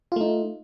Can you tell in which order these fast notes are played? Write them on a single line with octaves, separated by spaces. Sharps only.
F4 A3 D#4